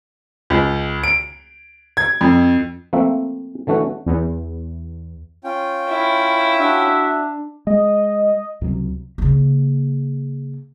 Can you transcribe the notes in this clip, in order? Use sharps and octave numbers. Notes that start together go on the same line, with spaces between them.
C#2
D7
G#6
F2
F3 A3 A#3 C4 E5
D3 E3 A3 C#4 F#4
E2
C#4 F4 G5
E4
D4 F#4 E5
G#3 D#5
C#2 C3 F#3
C#3 A#3